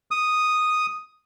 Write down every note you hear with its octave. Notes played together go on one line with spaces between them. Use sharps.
D#6